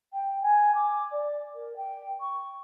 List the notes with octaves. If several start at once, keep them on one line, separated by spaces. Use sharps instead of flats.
G5
G#5
D6
D5
A#4
G5
C#6